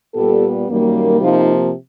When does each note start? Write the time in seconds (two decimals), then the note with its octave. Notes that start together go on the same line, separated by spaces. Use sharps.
0.15 A#2 G3 B3 G4 A4
0.68 F#2 D#3 G3 A#3
1.20 C3 F3 A#3 D#4 F4